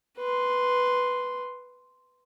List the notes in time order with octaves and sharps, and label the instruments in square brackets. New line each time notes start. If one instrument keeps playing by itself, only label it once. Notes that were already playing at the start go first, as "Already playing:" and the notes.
[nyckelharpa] B4 C6